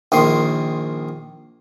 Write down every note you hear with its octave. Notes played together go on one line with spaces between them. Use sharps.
A#1 D#3 C6